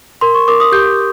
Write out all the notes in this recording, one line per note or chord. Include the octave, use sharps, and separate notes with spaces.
A#4 C6
C#6
A#4 D6
D#6
G4 G6